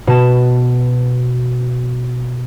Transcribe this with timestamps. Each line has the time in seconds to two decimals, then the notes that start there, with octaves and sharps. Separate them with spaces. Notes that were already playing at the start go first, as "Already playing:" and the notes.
0.07 B2 B4 A5 E7